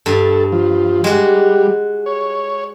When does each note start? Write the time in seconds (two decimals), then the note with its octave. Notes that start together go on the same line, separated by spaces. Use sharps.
0.06 G2 A4
0.52 F3
1.04 G3 G#3 F#4
2.06 C#5